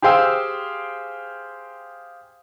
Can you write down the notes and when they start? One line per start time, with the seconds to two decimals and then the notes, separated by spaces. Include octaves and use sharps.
0.02 G4 G#4 C5 F5 G5 E6